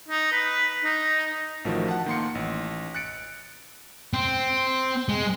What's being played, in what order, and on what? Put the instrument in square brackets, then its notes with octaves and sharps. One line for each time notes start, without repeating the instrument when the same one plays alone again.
[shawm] D#4
B4
D#4
[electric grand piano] A1 A2 D#3 F3 F#4
F#5 A5
D#3 A#3 C6 C#7
A1
F#6 A6 C#7 D7
[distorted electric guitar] C4
G#3